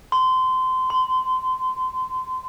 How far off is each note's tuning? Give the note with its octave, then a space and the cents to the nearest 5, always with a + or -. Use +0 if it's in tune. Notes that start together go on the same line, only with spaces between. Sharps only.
C6 -25
C6 -35